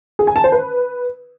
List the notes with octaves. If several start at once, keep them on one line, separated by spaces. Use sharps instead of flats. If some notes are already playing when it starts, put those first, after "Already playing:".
G#4
G#5
A5
C5
B4